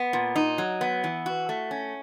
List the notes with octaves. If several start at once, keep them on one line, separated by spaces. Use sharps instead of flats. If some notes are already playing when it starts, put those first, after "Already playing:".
Already playing: B3
A#2
D#4
F#3
B3
E3
F#4
A3
C#4